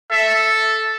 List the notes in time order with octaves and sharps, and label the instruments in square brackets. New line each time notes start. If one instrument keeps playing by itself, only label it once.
[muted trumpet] A4 [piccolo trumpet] E5